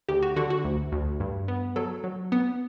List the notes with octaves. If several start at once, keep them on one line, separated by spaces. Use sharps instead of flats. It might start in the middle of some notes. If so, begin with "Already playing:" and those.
D2 G4
F#4
D3 F#4
F#4
D2
D2
G2
B3
F#3 A4
F#3
B3